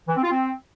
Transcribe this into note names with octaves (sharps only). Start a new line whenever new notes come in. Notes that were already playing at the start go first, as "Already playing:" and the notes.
E3
C4
F4
C4